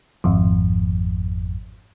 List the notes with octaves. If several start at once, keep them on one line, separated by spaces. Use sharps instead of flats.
G#1 F2